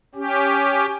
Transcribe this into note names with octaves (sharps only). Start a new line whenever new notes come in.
C#4 G4